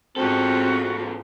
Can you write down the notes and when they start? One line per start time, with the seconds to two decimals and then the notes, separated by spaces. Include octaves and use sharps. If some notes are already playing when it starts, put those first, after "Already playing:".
0.16 E2 G#2 C4 C#4 F4 F#4 A4